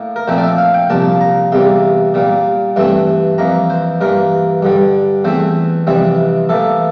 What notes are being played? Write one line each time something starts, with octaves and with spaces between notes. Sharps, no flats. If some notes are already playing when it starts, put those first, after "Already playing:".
Already playing: A2 A#3
A#4
A#2 F3 A3 C4 C5
D5
E5
F5
G5
C2 A#2 F3 A#3 A5
A#5
E2 C3 G3 A#3 C6
A#2 G3 A#3
G2 E3 A3 C4 C6
F2 E3 A#3 A#5
C5
G2 E3 A#3 A#4
G2 D3 G3
E2 E3 A3 C4 C5
F2 C3 E3 G3 C4
A2 E3 A#3 A4